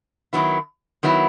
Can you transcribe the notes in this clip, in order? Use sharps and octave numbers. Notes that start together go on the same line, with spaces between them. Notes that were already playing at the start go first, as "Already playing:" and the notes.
D#3 F#3 B3 E4
D#3 F#3 B3 E4